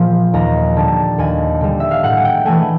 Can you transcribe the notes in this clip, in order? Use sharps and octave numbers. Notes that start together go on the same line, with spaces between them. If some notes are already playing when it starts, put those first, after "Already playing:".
Already playing: A#2 F3
D#2 A#5
D3 G3 A5
D#2 G#5
D3 G3
E5
F5
A2 F#5
G#5
G5
E3 A3 G#5